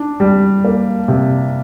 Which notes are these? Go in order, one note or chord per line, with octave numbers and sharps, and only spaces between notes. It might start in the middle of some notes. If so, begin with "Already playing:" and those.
Already playing: D4
G3
A#3
C3